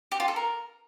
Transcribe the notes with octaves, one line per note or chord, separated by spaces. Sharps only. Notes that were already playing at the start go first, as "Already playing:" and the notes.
G4
F4
A4
A#4